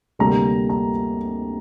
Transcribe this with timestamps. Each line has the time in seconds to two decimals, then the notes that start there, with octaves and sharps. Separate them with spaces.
0.19 D2 C3 G3 A#3 A#5
0.69 A#5